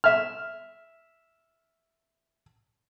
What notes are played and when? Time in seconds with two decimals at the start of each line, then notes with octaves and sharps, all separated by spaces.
0.04 E5 F6